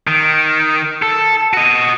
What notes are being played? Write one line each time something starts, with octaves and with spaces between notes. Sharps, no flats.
D#3
A4
F#4 D#5